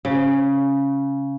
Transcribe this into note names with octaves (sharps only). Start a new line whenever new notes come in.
C#3